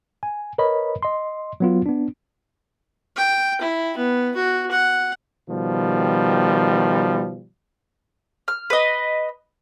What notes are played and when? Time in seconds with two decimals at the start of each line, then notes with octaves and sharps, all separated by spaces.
0.23 G#5
0.58 A#4 B4 C#5 D#5 B5
1.03 D#5 C6
1.60 F#3 B3 F4
1.86 B3 D4
3.17 G5
3.61 E4
3.97 B3
4.36 F#4
4.71 F#5
5.48 B2 D#3 F3 G3
8.48 F6
8.70 B4 D#5